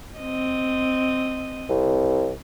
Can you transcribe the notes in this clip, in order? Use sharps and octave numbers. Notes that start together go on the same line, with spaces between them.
C4 D#5
C2